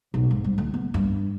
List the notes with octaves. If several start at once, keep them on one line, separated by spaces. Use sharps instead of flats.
B1
G#2
G3
D2
B3
G2